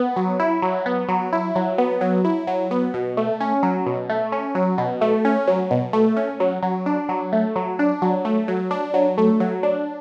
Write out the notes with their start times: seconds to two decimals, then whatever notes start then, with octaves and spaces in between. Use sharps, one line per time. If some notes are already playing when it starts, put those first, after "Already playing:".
Already playing: B3
0.16 F#3
0.40 E4
0.62 F#3
0.86 B3
1.09 F#3
1.33 E4
1.55 F#3
1.78 B3
2.01 F#3
2.25 E4
2.47 F#3
2.71 B3
2.94 B2
3.17 A3
3.40 C#4
3.63 F#3
3.86 B2
4.09 A3
4.32 C#4
4.55 F#3
4.78 B2
5.01 A3
5.25 C#4
5.48 F#3
5.71 B2
5.93 A3
6.17 C#4
6.40 F#3
6.63 F#3
6.86 D4
7.09 F#3
7.33 A3
7.56 F#3
7.79 D4
8.02 F#3
8.25 A3
8.48 F#3
8.71 D4
8.94 F#3
9.18 A3
9.40 F#3
9.63 D4